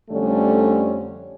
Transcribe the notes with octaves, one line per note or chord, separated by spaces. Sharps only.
F2 D3 G3 A3 C#4